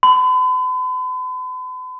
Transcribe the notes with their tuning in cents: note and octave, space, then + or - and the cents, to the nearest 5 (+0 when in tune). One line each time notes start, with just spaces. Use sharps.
B5 +45